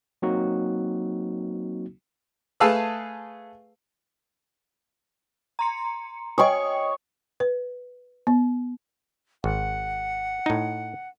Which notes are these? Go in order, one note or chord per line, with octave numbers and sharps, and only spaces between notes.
F#3 A#3 C4 D#4 F#4
A3 G#4 B4 F5 A5 E6
A#5 C6 C#7
C#5 D#5 G5 C#6 D#6
B4
B3
G#1 F#5
A2 D#4